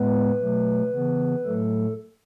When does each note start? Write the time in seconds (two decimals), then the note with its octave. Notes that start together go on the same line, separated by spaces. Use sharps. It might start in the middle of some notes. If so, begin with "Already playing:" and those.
Already playing: A2 G#3 B3 B4
0.41 B2 F#3 A3
0.93 C#3 E3 B3
1.45 A2 F#3 A3 A4